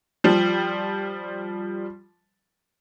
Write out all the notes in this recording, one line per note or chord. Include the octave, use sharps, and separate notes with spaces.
F3 G3